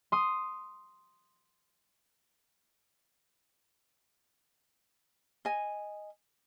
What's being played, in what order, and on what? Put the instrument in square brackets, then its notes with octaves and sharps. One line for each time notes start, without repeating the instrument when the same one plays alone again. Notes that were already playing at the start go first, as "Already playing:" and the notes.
[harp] C6 D#6
[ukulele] D#5 G#5